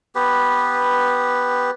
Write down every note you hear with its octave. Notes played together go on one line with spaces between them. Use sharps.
B3 G4 B4